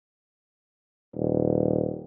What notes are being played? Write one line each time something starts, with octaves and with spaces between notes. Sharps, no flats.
D#1